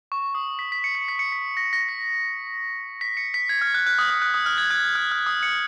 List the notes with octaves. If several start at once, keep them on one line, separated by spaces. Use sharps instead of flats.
C#6
D#6
B6
B6
C#7
C#7
B6
C#7
B6
A#6
A#6
B6
B6
C#7
B6
G#6
F6
F#6
F#6
D#6
D#6
F#6
D#6
F6
G#6
F#6
F6
F6
D#6
C#7